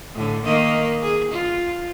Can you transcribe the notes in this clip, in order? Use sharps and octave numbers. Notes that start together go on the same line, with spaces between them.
A2 D3
D#3 A#3 D#5
G#4
F4